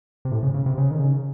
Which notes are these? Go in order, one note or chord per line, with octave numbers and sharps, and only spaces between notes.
C3
A2
C#3
C#3
C3
C#3
D#3
C#3